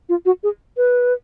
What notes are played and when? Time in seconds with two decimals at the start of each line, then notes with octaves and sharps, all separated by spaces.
0.09 F4
0.26 F#4
0.43 G#4
0.77 B4